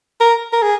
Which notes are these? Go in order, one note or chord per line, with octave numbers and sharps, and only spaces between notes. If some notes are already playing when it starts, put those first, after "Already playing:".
A#4
A#4
G#4